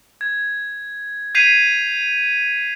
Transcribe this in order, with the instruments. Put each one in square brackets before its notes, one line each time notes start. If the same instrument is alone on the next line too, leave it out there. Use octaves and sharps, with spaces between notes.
[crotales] G#6
G6 G#6 B6 C7 D#7 F7